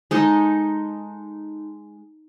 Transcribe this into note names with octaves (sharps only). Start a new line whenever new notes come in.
G#3 D#4 A4